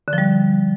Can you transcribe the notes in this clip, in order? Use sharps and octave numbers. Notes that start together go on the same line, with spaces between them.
D3
F3
G3